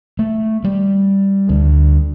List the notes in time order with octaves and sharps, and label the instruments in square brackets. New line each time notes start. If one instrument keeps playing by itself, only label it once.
[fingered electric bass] A3
G3
D2